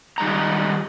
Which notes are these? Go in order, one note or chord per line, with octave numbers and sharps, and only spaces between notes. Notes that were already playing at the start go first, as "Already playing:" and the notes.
D#3 G3 G#3 D#4 A#5